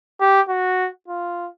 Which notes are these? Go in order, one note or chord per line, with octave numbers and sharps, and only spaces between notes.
G4
F#4
F4